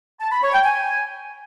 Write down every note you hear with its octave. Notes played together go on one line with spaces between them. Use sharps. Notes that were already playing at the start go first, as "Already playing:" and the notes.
A5
B5
C#5
G5
G#5